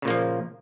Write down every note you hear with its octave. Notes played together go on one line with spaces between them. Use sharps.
A#2 C#3 F3 A#3